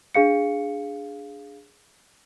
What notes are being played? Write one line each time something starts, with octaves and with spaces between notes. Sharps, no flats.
D4 G#4 F5 C#7